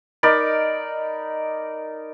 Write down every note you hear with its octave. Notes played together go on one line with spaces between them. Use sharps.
D#4 A#4 D5 B5